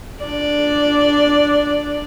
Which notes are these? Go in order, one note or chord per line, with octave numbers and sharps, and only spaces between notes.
D4 D5